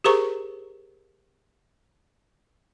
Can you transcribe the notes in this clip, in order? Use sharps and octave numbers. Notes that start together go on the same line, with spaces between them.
G4 G#4 A#4 C5 A#5 C#6